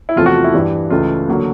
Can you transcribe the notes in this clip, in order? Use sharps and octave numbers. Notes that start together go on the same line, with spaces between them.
E4
E2 C3 F3 A3 F4
F#4
F4
E4
G2 E3 G3
C#2 C#3 E3 A3 F4
D3 F#3 A#3